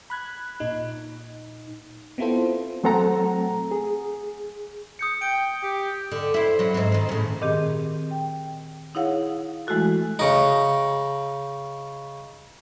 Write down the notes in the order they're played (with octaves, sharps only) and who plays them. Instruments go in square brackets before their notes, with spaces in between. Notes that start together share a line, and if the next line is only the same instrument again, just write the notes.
[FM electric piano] B5 F#6 G#6
A#2 D#4
B3 C4 E4 F4 A4 C5
[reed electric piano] F#3 A3 C4 A4 F#5 A#5
G#4
[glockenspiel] D#6 G6 C#7
[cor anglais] G5 [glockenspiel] D7
[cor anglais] G4
[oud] D3
E4 C5
F#3 C#4
G#2 C4
D#3 C5
A2 C#3
[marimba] A#2 D#3 C4 G4 G#4
G5
D#4 E4 G#4 C#5 F5 F#5
E3 G#3 A3 E4 F#4 A4
[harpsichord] C#3 D#4